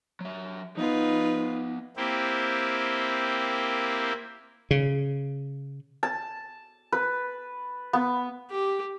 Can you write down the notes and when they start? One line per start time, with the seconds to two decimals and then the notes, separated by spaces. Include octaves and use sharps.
0.21 F#3 E5
0.77 F3 B3 D#4 F4 B4
1.97 A#3 C4 E4 G4
4.71 C#3
6.03 A5
6.92 B4
7.93 B3
8.51 G4